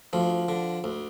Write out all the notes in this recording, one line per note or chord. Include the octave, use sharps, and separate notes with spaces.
D2 F3
D3
D2